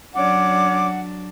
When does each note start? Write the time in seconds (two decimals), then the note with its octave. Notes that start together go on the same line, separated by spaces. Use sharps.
0.14 F#3 C#4 D4 D5 F#5 D6